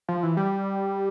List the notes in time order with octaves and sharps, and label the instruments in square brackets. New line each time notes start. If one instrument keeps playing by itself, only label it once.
[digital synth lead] F3
E3
G3